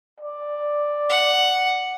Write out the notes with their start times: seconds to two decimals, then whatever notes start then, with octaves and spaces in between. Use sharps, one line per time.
0.20 D5
1.09 F#5